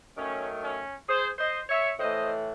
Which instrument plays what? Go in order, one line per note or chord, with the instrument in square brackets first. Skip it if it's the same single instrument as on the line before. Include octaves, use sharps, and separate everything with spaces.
[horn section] D#3 F#3 A3 C#4
C#4
G#4 C5
C5 D#5
C#5 E5
A2 E3 A3 C5 D#5